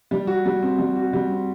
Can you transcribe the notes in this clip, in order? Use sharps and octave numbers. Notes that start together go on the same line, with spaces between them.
G3
F#4
G3
C4
G3
F#4
G3
C4